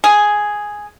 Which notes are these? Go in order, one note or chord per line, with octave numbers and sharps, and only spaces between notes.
G#4